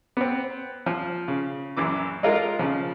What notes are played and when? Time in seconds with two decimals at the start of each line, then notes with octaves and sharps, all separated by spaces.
0.17 B3 C4
0.86 F3
1.28 C#3
1.77 A#1 F#2 E3 D6
2.23 G#3 D#4 F4 A4 A#4
2.59 C#3 F3